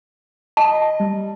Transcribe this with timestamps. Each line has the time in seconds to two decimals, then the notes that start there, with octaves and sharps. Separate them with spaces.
0.57 D#5 A5
1.00 G3